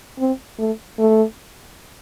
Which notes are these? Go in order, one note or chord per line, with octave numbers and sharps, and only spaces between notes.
C4
A3
A3